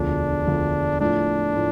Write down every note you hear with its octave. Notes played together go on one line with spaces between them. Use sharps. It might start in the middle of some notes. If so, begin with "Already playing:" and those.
Already playing: E1 D2 D3 F3 D4
E1 D2 D3 F3
A2 F3 A3 D4
A2 F3